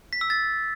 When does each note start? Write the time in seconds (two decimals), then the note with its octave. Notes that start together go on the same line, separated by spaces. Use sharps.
0.13 B6
0.21 E6
0.30 A6